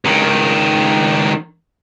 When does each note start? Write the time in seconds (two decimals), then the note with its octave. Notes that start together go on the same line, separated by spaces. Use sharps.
0.05 C#2 D#3